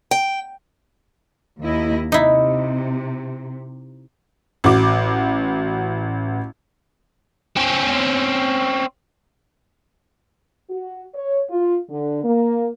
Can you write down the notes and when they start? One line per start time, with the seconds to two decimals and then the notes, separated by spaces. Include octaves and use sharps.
0.11 G5
1.61 D#2 E4 D#5
2.12 C3 D#4 E4
4.64 A1 F#4 D6
7.56 C4 C#4
10.70 F#4
11.15 C#5
11.50 F4
11.90 D3
12.24 A#3